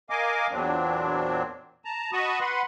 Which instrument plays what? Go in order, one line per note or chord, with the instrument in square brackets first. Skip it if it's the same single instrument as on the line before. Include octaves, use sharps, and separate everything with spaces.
[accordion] A#4 D#5 F5 G#5 D6
E2 A#2 F#3 C4 D4
A5 A#5
F#4 D#5 A5 B5 C#6 D#6
B4 F#5 B5 C6